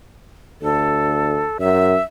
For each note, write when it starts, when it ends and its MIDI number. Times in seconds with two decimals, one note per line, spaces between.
0.62 1.43 38
0.62 1.58 69
1.60 1.95 42
1.60 2.02 76